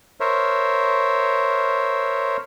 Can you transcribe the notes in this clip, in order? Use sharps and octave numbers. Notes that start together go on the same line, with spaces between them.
A#4 C5 C#5 E5